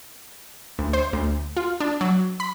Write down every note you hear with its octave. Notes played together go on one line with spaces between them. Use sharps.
D2
C5
D2
F4
D4
F#3
B5